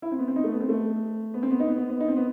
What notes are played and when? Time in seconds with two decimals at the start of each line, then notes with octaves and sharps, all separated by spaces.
0.02 E4
0.12 C4
0.19 B3
0.28 C4
0.36 D#4
0.44 A3
0.52 B3
0.60 C4
0.69 A3
1.34 B3
1.43 C4
1.51 B3
1.60 D#4
1.68 B3
1.78 B3
1.89 B3
2.01 D#4
2.08 C4
2.17 B3